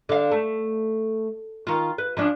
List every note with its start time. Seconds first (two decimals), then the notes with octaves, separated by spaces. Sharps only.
0.09 D3 F5
0.31 A3
1.67 D#3 F4
1.98 B4
2.17 F3 C#4 D4